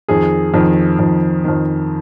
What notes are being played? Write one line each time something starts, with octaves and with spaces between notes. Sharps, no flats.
F2 D#3 G#4
F2 D#3
F2 D#3
F2 D#3